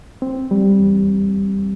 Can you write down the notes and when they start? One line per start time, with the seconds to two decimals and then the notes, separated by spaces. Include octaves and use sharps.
0.22 C4
0.51 G3
0.80 E2